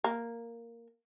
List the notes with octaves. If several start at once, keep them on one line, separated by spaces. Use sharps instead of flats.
A#3